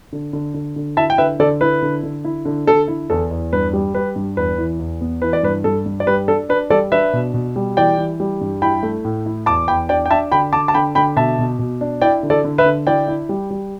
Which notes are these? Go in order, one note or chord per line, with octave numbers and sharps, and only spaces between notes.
D3
D3
D3
D3
E4 E5 A5
G5
D3 B4 E5
D3 A4 D5
E4 B4
D3
D3
E4
D3
D3 A4
E4
E2 A4
E2
G2 B4
G3
G3 B4
G2
E2 B4
E3
E2
B3
E3 B4
D5
G2 B4
G2 A4
G2
D5
G3 B4
D4 A4
D4 B4
G3 A4 D5
D4 B4 E5
B2
B2
G3
E3 D5 G5
E3
G3
G2
E4 G5 B5
A3
A2
E4
E2 A5 D6
E2 G5 B5
D4 D5 G5
G5
D4 E5 A5
D3 G5 B5
D3 A5 D6
A5
D3 G5 B5
D3 G5 B5
B2 E5 A5
B2
B2
D4
E4 D5 G5
D3
A4 D5
D3
B4 E5
D3
E4 D5 G5
E4
G3
G3